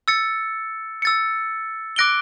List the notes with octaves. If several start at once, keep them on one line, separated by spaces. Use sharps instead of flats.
E6 A6 C#7
E6 A6 C#7
D6 F#6 A#6 D7 G7